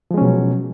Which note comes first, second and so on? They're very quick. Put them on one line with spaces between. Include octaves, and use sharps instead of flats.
F3 G#3 C#4 B2 F#3